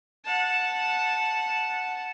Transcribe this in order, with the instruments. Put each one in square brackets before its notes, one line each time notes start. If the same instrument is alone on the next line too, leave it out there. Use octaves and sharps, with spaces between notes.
[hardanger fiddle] F#5 A5